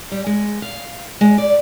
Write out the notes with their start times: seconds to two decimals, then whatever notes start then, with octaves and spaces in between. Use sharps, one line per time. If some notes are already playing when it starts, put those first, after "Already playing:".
0.12 G3
0.26 G#3
0.62 F5
1.21 G#3
1.38 D5